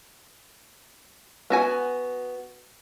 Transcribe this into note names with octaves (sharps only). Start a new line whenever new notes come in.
B3 F#4 G#5